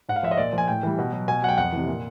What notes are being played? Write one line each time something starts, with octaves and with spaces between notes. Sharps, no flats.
G#2 F#5
F5
F3 E5
D#5
A#2 D5
F3
G#5
A2 G5
E3 G3
B2
F#3
B2 G#5
F#3 F#5
G5
F2 F#5
C3 E3
A#2